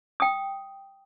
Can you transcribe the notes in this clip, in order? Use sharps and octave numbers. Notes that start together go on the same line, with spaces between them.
G5 D#6